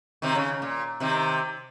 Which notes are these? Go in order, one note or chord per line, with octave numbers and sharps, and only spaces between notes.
C3 D#3
C#3
A#2
C3 D#3